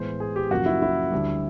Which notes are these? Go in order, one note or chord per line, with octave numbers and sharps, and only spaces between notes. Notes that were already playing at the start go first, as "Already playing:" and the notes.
Already playing: A2 E3 G#3 B3 C5
G#4
G4
F#2 C#3 F3 A#3 F#4
E4
E4
D2 D3 G3